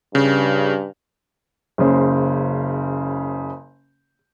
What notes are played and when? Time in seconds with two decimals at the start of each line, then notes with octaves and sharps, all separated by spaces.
0.15 G2 C#3
1.78 F#1 C#3 C5